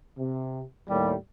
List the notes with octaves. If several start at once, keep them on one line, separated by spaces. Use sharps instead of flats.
C3
D#2 A2 G3